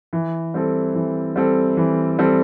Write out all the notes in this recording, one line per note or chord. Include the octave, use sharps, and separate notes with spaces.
E3
G3 C4 A4
E3
G3 C4 A4
E3
G3 C4 A4